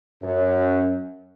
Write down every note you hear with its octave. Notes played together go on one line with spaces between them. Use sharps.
F#2